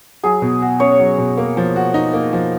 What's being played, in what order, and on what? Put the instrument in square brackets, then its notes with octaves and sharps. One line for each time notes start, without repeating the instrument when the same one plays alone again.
[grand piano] F#3 [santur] G#4
[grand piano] B2
F#4
[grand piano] C#4 [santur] C#5
[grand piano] F#3
B2
A#3
F3
F#4
D#4
A#3
F3